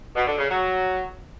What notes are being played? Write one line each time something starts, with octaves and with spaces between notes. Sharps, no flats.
B2
D3
C#3
F#3